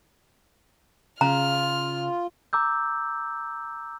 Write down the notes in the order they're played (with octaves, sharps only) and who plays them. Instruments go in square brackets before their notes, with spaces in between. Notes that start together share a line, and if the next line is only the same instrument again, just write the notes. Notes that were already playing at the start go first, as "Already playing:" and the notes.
[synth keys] C#3 [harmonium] F4 [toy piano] A#5 [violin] F6
[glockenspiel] A#5 D6 E6 G6